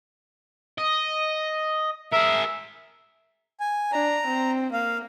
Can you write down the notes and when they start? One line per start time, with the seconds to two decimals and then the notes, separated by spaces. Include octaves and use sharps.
0.78 D#5
2.12 G#4 A#4 E5
3.60 G#5
3.92 D4 A#5
4.28 C4
4.73 A#3 F5